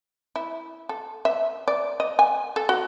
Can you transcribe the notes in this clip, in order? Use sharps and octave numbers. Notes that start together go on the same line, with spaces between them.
E4
A4
E5
D5
D#5
G#5
A4
F#4